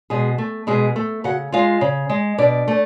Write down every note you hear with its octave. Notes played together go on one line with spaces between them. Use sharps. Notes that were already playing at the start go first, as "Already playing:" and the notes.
B2 G#3 G#4
A3
B2 G#3 G#4
A3
C#3 F#4 F#5
G#3 F4 F5
C#3
G#3
B2 D4 D5
A3